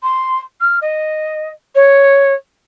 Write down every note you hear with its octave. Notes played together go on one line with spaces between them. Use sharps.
C6
F6
D#5
C#5